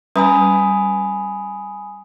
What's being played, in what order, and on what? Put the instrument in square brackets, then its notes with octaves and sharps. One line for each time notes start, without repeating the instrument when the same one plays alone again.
[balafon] G3 C#4 B4 [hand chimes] G#5 B5 D#6